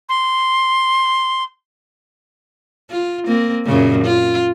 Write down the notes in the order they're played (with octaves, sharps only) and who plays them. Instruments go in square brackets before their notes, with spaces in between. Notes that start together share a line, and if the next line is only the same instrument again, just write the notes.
[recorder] C6
[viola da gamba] F4
A#3 C4
F#2 A#2 C#3
F4